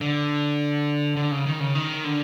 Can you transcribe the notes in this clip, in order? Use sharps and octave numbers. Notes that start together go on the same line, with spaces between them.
D3
D3
C#3
D#3
C#3
D#3
D3